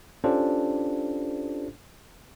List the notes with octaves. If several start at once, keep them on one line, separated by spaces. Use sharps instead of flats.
C#4 D4 F4 G4 A4 C5